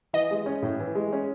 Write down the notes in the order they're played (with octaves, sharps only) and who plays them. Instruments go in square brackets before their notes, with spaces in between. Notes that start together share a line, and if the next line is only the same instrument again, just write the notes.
[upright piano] E3 [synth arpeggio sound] D#5
[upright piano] G#3
C#4
A2
E3
G#3
C#4